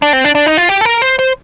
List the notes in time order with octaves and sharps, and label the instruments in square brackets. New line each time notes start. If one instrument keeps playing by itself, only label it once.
[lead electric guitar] D4
C4
D4
D4
D#4
F4
G4
A4
A#4
C5
C5